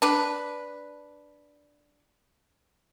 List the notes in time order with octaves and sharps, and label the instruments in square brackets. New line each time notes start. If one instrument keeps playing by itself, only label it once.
[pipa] D4 B4